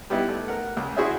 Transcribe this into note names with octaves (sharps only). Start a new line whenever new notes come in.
G3 B3 D#4 E4
A3
A#4 F#5
C#2
E4 F#4 G#4 C5 E5